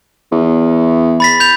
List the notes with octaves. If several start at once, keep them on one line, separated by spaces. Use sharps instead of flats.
E2
B5 A6 B6
G6 F7